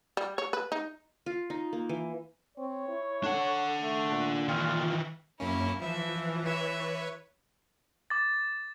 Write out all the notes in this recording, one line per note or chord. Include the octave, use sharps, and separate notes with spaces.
G3
C#5
B4
D#4
F4
D#4
A#3
E3
C4 C#5
E4
D4 A4 F#5
A3
A#2
D#3 E3 F4
F#2 A#3 C#4 E4
E3 F3 E5
B4 C#5 E5
D6 A6